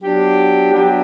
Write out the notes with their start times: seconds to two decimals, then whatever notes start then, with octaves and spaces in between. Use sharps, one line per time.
0.03 F#3 B3 D4 G4
0.72 F#3 B3 D4 G4